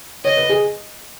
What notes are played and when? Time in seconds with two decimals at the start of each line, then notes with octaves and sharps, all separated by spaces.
0.24 C#5 D#5
0.37 B4
0.49 G#4